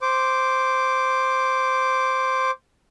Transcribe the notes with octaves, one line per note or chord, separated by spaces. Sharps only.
C5 D6